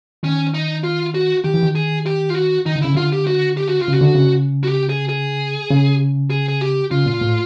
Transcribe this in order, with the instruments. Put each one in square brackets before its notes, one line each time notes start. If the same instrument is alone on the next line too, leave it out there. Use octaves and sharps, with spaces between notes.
[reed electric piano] D#3 [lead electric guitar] C#4
[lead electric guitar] D#4
F4
F#4
[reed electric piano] D#3 [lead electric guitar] G4
[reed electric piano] E3
D#3
[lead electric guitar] G#4
G4
F4
F#4
[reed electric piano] D#3 [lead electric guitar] D#4
[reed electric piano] D3
[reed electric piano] C#3 [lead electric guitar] E4
[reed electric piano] D3 [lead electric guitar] F4
[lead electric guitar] G4
F#4
G4
F#4
F4
[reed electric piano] C#3
[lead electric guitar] F#4
[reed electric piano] D3
C#3
[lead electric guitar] F#4
G4
G#4
G#4
[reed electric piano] C#3
[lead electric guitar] G#4
G#4
G4
[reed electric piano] C#3 [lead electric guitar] F4
[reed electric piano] A#2
A2